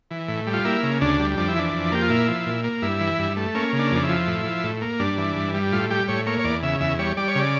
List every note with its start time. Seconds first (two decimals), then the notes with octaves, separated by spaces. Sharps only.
0.11 E3
0.28 A2
0.47 G3
0.53 F4
0.65 A#3 E4
0.83 C#3
1.01 D2 D4
1.20 G3
1.37 F2 D4
1.48 E4
1.56 E3 D4
1.74 F2
1.92 A#3 G4
2.02 F4
2.10 A#2 E4
2.28 F3
2.46 A#2
2.64 A#3
2.82 G2 E4
3.01 E3
3.19 G2
3.37 A3
3.55 A#3 C#4
3.73 C#3
3.79 D4
3.92 F2 D4
4.03 E4
4.09 F3
4.27 A2
4.46 F3
4.64 A2
4.82 A#3
5.00 G2 D4
5.18 E3
5.36 G2
5.54 G3
5.72 A2 F4
5.90 G3 G4
6.08 A2 C#5
6.27 A#3 C#5
6.39 C#5
6.44 E2 D5
6.63 C#3 E5
6.81 E2 E5
6.99 G3 C#5
7.17 G3 D5
7.28 C#5
7.35 C#3 D5